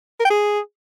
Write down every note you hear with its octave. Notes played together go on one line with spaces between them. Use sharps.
A#4
G5
G#4